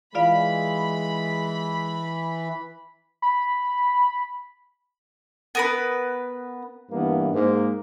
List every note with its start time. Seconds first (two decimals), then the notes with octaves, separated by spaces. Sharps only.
0.15 E3 G#3 F4 D5 F5 B5
3.22 B5
5.55 B3 A#4 B4
6.91 G2 E3 A#3 B3
7.34 G#2 A#3